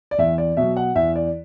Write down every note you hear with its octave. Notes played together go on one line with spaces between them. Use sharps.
D5
E2 E5
D5
B2 F#3 E5
F#5
E2 E5
D5